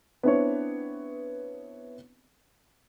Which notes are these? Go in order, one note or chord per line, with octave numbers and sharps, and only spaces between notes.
B3 C4 D4 E4 B4 C#5